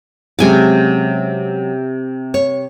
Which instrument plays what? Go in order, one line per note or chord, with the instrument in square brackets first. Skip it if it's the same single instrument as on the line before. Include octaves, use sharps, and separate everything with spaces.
[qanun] C3 G#5 D6 [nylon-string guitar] F#3 G#3 C#4
[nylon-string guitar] C#5